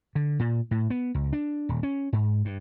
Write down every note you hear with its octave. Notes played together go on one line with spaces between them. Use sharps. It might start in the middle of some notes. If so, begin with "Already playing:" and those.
D3
A#2
A2
B3
C#2
D4
D#1
C#4
G#2
G2